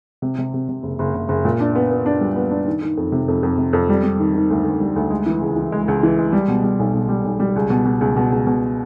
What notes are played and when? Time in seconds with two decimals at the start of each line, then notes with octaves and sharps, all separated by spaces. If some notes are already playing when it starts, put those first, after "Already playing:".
0.22 C3
0.38 C3
0.54 C3
0.69 C3
0.83 F#1
0.99 F#1
1.15 F#1
1.29 F#1
1.45 A#2
1.60 D4
1.75 B3
1.91 B3
2.06 D4
2.21 G3
2.36 B3
2.51 D4
2.67 D#3
2.82 D#3
2.97 F2
3.12 C3
3.28 F2
3.43 F2
3.58 C3
3.73 F2
3.89 G3
4.04 G3
4.20 D#3
4.35 D#3
4.50 D2
4.65 D2
4.81 G3
4.96 D2
5.10 G#3
5.26 E3
5.41 C#2
5.56 E3
5.72 G#3
5.88 C#2
6.03 E3
6.18 G#3
6.33 G3
6.48 B2
6.64 G3
6.79 B1
6.94 B1
7.09 G3
7.25 B1
7.40 G3
7.56 C#2
7.70 B2
7.85 B2
8.01 C#2
8.16 B2
8.31 C#2
8.47 B2